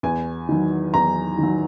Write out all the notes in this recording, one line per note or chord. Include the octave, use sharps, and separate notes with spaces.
E2 G#5
D#3 F#3
E2 A#5
D#3 F#3